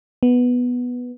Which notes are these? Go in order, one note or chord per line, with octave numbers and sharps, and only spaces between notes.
B3